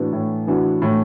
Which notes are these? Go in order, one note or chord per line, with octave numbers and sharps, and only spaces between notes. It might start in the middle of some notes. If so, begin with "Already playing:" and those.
Already playing: A2 E3 B3 D4 F#4
A2
E3 B3 D4 F#4
A2